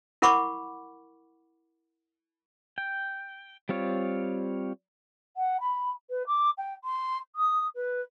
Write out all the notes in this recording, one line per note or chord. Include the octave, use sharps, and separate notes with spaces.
E4 A#4 F#5 B5 C#6 D6
G5
G3 C4 F4 C#5
F#5
B5
B4
D6
G5
C6
D#6
B4